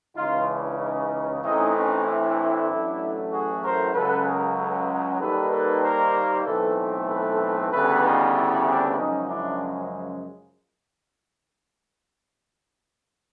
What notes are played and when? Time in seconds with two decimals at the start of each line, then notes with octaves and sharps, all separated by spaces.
0.16 C#2 C#3 E3 D#4 F4
0.48 D4 E4
0.80 C#4 D#4
1.42 A2 E3 A3 C4 C#4 D#4
1.74 C#4 D#4
2.05 D4 E4
2.69 A1 A2 F#3 A3
3.31 F#4 G#4
3.63 A#4 C5
3.94 C#2 C#3 F#3 A4 B4
4.26 G#4 A#4
4.57 A4 B4
5.20 D#2 D#3 G3 A#3 A4 B4
5.51 A4 B4
5.83 A#4 C5
6.45 B1 A2 E3 A3 C4 A4 B4
7.08 A4 B4
7.71 D2 C#3 E3 G3 B3 A4 B4
8.03 D#4 F4
8.34 D4 E4
8.66 C4 D4
8.97 F#2 C#3 F3 G#3 C#4 D#4
9.29 D4 E4